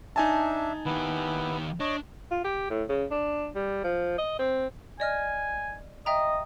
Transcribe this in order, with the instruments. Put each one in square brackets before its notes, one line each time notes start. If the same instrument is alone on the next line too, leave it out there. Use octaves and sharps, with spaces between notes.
[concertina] D4 E5 [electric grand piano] D#4 G#5 A5
[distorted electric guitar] D#3 G4 [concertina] B3 E4 B4
[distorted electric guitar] D4 [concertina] C#5 D#5
[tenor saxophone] F4
G4
A2
C#3
D4
G3
F3
D#5
C4
[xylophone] D5 D#5 F6 [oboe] G#5
[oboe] D#5 [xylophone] E5 G5 A#5